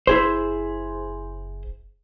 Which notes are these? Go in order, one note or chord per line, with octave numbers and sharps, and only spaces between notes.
F#1 E4 G#4 C5